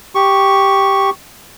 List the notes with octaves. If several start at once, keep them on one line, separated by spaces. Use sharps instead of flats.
G4 C#6